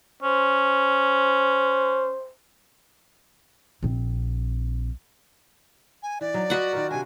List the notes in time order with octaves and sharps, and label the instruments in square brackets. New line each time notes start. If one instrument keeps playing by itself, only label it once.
[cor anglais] C#4 [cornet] C5
[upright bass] A#1 C4
[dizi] G#5
[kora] E3 [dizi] D5
[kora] F#3 D#4
[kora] F4 B4 D#5 [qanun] F#4 F#5
[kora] D#3 F4 A#4
[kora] C3 D4 [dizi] G#5